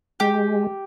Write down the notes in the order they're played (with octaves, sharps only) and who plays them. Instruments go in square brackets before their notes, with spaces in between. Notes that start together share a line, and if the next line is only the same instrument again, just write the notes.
[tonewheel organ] G#3 [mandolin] G4